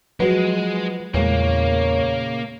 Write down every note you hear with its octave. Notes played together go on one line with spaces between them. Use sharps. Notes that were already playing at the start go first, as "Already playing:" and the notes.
F3 F#3 G#3 F#4 B4
E2 A#2 C#3 G#3 A#3 C#5